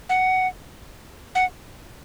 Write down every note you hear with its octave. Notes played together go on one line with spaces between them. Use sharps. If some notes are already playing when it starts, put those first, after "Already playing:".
F#5
F#5